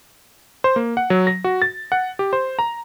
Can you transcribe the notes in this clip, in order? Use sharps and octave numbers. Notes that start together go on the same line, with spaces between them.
C5
A#3
F#5
F#3
A#6
F#4
A6
F#5
G4
C5
A#5